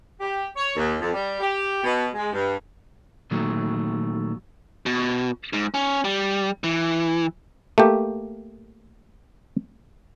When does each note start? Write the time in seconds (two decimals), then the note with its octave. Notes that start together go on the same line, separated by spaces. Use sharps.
0.21 G4
0.56 C#5
0.76 D#2
1.01 F2
1.14 G3
1.41 G4
1.84 B2
2.14 G#3
2.33 G2
3.31 A#2 D#3 F#3 A3
4.86 B2
5.53 G#2
5.74 C#4
6.05 G3
6.64 E3
7.78 A3 A#3 G4